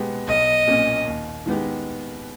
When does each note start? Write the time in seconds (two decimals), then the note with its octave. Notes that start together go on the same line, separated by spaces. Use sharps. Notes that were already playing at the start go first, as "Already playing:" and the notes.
Already playing: B2 G#3 B3 G4
0.27 B1 D#5
0.67 A#2 A#3 C#4
1.06 D#2
1.46 D#3 G#3 B3 G4